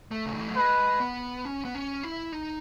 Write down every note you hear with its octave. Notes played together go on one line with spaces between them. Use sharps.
A3
C#3
D#3
E3
F#3
G#3 B4
B3
C#4
B3
C#4
E4
D#4